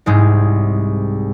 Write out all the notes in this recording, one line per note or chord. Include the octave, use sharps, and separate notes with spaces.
C2 G#2 G#3